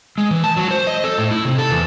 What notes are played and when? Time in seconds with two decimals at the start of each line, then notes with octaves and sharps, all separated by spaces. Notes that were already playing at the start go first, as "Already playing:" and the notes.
0.18 G#3
0.31 E3
0.44 A5
0.57 F#3
0.71 C5
0.87 D#5
1.04 A4
1.18 A2
1.31 E4
1.45 C3
1.58 A4
1.71 E2